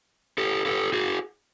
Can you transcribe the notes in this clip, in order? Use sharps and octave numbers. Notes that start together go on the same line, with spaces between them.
G4 A4
G4 A4
F#4 G#4